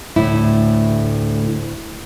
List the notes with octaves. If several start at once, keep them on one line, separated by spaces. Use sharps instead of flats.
D2 A2 E4